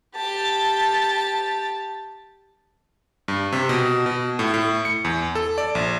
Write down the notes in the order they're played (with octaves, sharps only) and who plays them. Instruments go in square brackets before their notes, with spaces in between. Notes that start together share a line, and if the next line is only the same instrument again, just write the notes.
[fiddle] G4 A5
[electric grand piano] G2
C3
B2
B2
A2
A2
C#7
E2
A4
D5
A#1